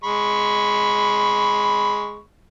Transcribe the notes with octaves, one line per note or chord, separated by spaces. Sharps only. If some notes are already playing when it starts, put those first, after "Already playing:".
G#3 B5 C#6